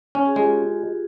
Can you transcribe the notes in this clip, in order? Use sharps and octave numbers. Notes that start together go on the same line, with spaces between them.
C#4
F#4 G#4
G#3 F4 G4